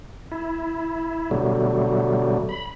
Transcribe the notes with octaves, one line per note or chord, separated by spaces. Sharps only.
E4
B2 D3 F#3 G3 A3
B5